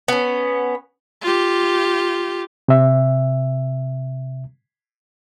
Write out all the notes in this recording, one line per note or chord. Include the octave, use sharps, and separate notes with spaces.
B3 C#4
F4 G4
C3 E5